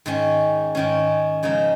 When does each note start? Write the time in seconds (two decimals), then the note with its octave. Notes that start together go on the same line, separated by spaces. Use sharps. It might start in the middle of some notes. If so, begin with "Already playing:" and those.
0.06 G#2 D#3 C#4
0.75 G#2 D#3 C#4
1.43 C#3 F3 G#3 D#4